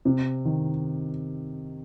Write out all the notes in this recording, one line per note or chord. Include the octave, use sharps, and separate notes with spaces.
C3
D#3